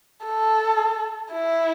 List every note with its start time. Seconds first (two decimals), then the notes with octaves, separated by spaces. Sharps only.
0.25 A4
1.32 E4